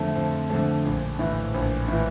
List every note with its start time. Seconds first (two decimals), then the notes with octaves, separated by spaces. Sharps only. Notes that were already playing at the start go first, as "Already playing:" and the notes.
Already playing: F2 D3 F3 A3
0.15 F2
0.50 D3 F3 A3
0.85 A#1
1.19 A2 E3
1.54 A#1
1.88 A2 E3